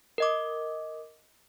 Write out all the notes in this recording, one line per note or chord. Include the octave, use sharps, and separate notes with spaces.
A#4 D#5 D6